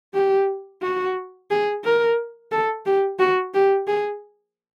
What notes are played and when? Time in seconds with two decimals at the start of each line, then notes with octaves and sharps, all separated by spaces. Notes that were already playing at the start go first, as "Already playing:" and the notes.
0.14 G4
0.82 F#4
1.50 G#4
1.84 A#4
2.52 A4
2.85 G4
3.19 F#4
3.54 G4
3.87 G#4